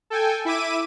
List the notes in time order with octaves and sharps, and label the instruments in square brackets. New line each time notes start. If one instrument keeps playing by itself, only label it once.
[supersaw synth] A4 G5 G#5
E4 E5 D6 D#7